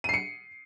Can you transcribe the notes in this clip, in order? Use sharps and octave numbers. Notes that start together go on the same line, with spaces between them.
C7 C#7 D#7